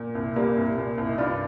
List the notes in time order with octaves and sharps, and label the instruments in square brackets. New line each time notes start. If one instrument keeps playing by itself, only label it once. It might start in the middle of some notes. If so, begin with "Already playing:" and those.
Already playing: [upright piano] A#2
C2
A#2 G3 A#3
C2
A#2
C2
D#4
G2 D4 F4